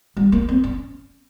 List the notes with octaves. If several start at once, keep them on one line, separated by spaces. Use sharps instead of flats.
G3
A#3
C4
C#4